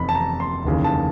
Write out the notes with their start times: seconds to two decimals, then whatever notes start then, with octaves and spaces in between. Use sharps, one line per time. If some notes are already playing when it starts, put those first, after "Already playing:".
Already playing: F1 E2 C3 B5
0.09 A5
0.15 A#5
0.40 C6
0.64 F1 D#2 C#3 E3
0.84 A5